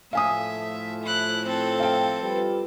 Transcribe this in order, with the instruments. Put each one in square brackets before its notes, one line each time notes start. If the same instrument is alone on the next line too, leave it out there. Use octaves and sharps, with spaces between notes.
[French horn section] A2 F3 A3 [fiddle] E5 [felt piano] F5 G#5 D#6
[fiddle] E4 F#6
C4 A4
[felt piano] F5 G5
[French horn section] G3 F4 B4